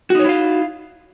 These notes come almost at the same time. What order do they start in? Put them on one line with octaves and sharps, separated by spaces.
F#4 D#4 C#5 E4 F5